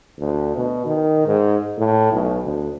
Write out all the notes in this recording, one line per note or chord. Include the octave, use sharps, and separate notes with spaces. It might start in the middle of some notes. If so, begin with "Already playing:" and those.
D2
B2
D#3
G#2
A2
B1
D2